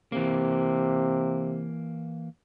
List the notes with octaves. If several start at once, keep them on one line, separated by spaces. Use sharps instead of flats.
C3 E3 A#3